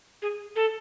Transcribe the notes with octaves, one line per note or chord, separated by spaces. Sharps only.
G#4
A4